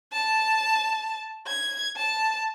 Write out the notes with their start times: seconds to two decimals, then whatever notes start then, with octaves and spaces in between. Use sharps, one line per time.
0.13 A5
1.48 G#6
1.97 A5